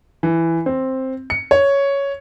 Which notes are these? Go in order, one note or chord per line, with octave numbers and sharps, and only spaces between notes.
E3
C4
C#7
C#5